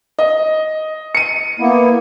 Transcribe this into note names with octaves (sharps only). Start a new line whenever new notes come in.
D#5
C#7 D#7
A#3 B3 E4